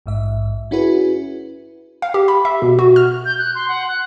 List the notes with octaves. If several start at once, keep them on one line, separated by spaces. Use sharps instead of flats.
A#1 G#2 E5
C#4 E4 F#4 G#4 B4
F5
G4
B5
E5
B2
F#4
F6
G6
F#6
C6
F#5
F#6